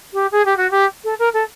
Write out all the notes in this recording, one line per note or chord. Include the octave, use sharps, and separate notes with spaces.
G4
G#4
G4
F#4
G4
A4
A#4
A4